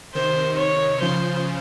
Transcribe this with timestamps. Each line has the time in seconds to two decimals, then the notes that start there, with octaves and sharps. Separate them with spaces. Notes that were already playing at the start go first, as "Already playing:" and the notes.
0.15 C3 D#3 C5
0.58 C#5
1.01 C#3 F3 C5